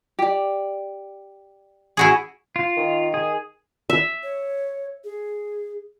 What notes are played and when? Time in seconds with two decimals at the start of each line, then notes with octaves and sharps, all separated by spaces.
0.19 G4 D5
1.97 E4 F#4 G#4
2.56 F4
2.77 D#3
3.14 G#4
3.90 E5
4.23 C#5
5.04 G#4